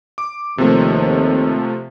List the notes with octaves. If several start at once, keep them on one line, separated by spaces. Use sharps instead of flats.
D6
D#2 C3 F3 A3